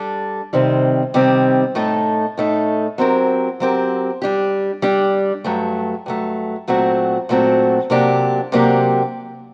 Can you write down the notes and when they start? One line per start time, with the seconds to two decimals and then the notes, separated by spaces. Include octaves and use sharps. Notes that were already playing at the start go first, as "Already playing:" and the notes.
Already playing: G3 D4 A4
0.53 C3 D#3 G3 C4
1.14 C3 D#3 G3 C4
1.75 A2 A3 D#4 A4
2.37 A2 A3 D#4 A4
2.98 F#3 C4 G4 A#4
3.60 F#3 C4 G4 A#4
4.22 G3 D4 G4
4.82 G3 D4 G4
5.44 G2 F#3 A3
6.06 G2 F#3 A3
6.68 A#2 F#3 A3 C4 F#4
7.29 A#2 F#3 A3 C4 F#4
7.90 C3 F#3 A#3 D4 G4
8.52 C3 F#3 A#3 D4 G4